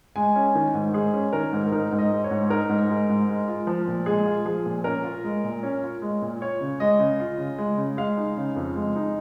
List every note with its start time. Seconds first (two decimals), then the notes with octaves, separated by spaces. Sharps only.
0.16 G#3 G#5
0.36 C#4
0.55 D#3
0.74 G#2
0.94 G#3 G#4
1.13 C#4
1.33 D#3 A#4
1.53 G#2
1.72 D#4 A#4
1.92 G#2
1.98 D#5
2.11 G#3
2.24 C#5
2.31 G#2
2.50 D#4 A#4
2.69 G#2
2.89 G#3
3.09 G#2
3.29 G#3
3.48 F4
3.67 F3
3.88 A#2
4.06 G#3 G#4
4.26 F4
4.45 F3 G#4
4.66 A#2
4.84 C#4 A#4
5.04 F4
5.24 G#3
5.44 A#2
5.63 C#4
5.82 F4
6.02 G#3
6.22 A#2
6.41 F4 C#5
6.61 C#3
6.80 G#3 D#5
6.99 C#3
7.20 F4
7.38 C#3
7.58 G#3
7.78 C#3
7.97 G#3 F5
8.17 D#4
8.37 C#3
8.56 F2
8.76 G#3
8.96 D#4